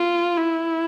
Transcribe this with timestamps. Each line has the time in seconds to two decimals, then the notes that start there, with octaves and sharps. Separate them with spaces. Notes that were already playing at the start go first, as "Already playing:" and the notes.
Already playing: F4
0.37 E4